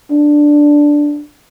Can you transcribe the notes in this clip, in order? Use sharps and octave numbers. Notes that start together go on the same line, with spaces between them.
D4